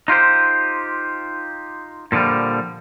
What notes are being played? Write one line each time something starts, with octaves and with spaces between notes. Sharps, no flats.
D#4 F4 G4 C5
A#2 D3 E3 F3 G3